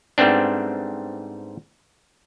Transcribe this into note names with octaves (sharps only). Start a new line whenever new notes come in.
G#2 G3 A3 B3 C4 D4